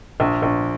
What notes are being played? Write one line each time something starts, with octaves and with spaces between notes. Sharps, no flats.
A#1
A#1